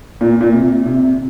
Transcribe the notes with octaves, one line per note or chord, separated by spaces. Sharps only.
A#2
A#2
C3
C3